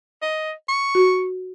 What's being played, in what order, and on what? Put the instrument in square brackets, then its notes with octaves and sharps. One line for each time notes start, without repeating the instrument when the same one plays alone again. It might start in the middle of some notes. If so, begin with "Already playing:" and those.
[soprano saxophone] D#5
C#6
[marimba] F#4